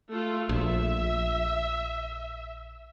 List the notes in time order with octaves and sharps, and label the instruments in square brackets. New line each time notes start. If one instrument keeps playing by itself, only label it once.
[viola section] A3 F4
[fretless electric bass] A#1 [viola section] E5